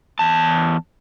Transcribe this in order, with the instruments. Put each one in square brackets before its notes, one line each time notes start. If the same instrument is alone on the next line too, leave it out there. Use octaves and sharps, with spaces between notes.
[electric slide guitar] E2 A5